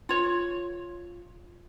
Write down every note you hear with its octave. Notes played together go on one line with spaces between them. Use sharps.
F4 C#5